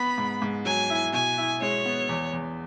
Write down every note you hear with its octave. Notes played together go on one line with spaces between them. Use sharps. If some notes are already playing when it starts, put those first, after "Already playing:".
Already playing: B3 B5
G#2
G#2
F#3 G#5
E4
B2 G#5
E4
G#3 C#5
B3
E2
E2